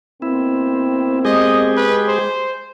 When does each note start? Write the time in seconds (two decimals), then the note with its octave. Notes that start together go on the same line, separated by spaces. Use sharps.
0.22 B2 A#3 C4 E4
1.25 G#3 G4 G#4 D#5
1.76 B4
2.08 C5